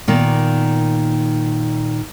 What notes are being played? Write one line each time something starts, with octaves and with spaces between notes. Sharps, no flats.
A#2 D#3 A#3 B3